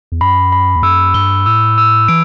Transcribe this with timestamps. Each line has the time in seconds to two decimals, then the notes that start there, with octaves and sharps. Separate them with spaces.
0.12 E2
0.20 F#2 B5
0.52 B5
0.76 E2
0.83 F#2 E6
1.14 G2 G7
1.46 A2 E6
1.78 E6
2.08 E3 D7